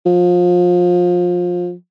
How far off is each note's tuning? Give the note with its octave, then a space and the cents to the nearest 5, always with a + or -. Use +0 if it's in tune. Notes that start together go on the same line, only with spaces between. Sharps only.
F3 +25